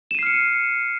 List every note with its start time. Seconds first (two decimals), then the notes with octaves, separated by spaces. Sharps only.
0.11 E7
0.15 D#7
0.19 C7
0.23 F6
0.27 C#7